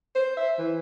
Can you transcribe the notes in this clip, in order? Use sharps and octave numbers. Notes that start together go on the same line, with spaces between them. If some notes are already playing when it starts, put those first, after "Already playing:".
C5
E5
E3